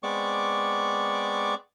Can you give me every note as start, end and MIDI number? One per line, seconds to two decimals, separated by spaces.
0.03 1.55 56
0.03 1.55 59
0.03 1.55 60
0.03 1.55 74
0.03 1.55 85
0.03 1.55 86